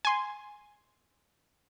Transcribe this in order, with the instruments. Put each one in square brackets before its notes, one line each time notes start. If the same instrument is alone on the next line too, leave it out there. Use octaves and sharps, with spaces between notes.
[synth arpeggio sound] G#5 C6